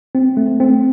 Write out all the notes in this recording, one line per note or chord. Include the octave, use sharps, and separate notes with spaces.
C4
A3
C4